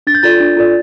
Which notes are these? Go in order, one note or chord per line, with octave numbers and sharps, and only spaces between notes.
D4 A6
G6
F4 A4 D5 A6
D4
F4 A4 D5